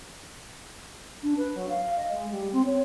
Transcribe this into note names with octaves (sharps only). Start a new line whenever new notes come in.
D4
B4
F#3
F5
D#5
G#3
G3
C4
C#5